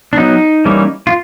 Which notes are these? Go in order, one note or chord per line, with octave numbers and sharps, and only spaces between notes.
D4
F#3 B3 D#4
E3 G3 A#3 C#4
F4